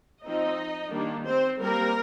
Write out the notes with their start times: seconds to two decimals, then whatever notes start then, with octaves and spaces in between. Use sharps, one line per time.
0.24 F3 C4 D#4 D#5
0.93 D#3 G3 A#3 D4
1.27 C4 C5
1.61 G3 A#3 C4 A#4